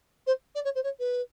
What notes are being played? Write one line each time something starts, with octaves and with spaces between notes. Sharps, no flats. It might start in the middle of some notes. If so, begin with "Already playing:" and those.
C5
D5
C#5
C5
C#5
B4